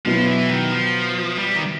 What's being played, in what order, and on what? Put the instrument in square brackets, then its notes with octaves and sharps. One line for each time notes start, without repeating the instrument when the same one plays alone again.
[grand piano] B2 F#3 B3 E4 [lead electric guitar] F3
[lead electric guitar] E3
D#3
F3
G3
D#3